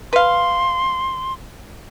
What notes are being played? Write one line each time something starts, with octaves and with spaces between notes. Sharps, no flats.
B4 F5 C6